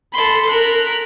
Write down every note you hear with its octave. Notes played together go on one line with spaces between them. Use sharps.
A4 B5 C6
A#4 F#6 B6